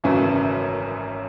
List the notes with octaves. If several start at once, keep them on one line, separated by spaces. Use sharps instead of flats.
G#1 F#2 C#3 E3 A3